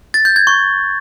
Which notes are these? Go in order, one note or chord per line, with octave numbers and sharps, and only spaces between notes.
A6
G6
G#6
C#6